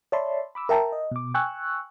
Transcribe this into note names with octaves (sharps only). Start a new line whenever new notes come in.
C#5 D5 E5 A5 B5 C6
B5 D6 E6
A#4 E5 G5 A5 A#5
D#5
B2 D6
G5 G#5 C#6 E6 F#6